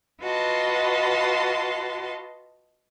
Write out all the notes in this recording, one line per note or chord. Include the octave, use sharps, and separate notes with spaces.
F4 F#4 B4 D#5 A5 C6